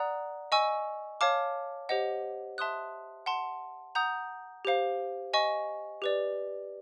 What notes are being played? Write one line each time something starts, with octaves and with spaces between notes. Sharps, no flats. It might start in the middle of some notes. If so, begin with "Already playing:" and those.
Already playing: D5 F#5 A#5 D#6 F#6
D#5 G#5 C#6 E6
C#5 F5 A5 D6 F6
G4 C5 D#5 F#5
E5 A5 C6 D#6 F#6
F#5 A5 C6
F#5 A#5 D#6 G6
G4 C5 F5
D#5 G#5 C#6
G4 B4 D5